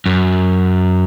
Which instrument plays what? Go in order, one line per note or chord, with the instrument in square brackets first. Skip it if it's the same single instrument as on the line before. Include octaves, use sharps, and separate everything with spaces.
[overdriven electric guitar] F#2